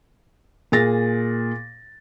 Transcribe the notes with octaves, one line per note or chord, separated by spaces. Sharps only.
A#2 G#4 A6 A#6